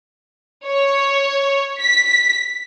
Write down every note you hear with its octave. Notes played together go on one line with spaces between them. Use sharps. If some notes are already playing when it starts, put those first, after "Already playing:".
C#5
B6